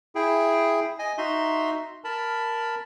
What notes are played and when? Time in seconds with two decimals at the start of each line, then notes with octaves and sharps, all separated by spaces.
0.15 E4 G#4 G5
0.99 D#5 G#5
1.18 D#4 F#4 E5 C6
2.04 A#4 A5 B5